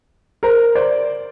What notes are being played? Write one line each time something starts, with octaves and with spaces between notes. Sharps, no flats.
A#4 C5
C5 D5